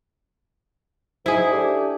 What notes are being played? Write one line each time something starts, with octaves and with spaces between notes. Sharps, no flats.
G#2 E4 G#4
A3 D4 G4